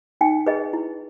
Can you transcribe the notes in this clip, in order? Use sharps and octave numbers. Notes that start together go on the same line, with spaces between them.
D#4 G5
G#4 B4 D#5
E4